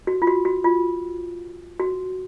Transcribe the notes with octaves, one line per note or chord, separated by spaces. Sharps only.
F#4
F4
F#4
F#4
F4
F#4